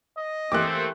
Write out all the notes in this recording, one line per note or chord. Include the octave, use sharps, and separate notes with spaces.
D#5
E3 A3 A#3 C4 G4 D6 F#6